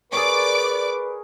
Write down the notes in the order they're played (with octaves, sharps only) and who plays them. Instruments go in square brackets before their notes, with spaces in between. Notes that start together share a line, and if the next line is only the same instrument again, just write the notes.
[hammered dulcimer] G#4 A#4 C#5 [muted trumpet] B4 [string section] D5 D6